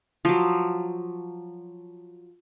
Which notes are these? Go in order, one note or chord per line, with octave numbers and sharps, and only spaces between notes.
F3 F#3